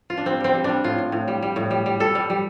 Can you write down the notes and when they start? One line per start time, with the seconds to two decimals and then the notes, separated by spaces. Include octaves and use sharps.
0.10 F4
0.17 D4
0.25 G3 C4
0.40 G3 C4
0.54 G3
0.64 G3 D4
0.84 A2 F4
0.98 A2
1.12 A2
1.28 G3
1.42 G3
1.56 A2
1.71 G3
1.86 G3
2.00 G3 A4
2.15 G3
2.30 G3